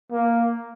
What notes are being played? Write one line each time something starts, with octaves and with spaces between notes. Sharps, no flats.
A#3